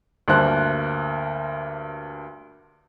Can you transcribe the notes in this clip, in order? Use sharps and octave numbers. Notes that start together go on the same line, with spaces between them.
D2 G2 A#3 C5 A5 F#6